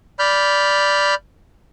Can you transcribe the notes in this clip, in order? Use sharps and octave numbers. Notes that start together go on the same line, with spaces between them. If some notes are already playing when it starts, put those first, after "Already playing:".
D5 B5 F6 G6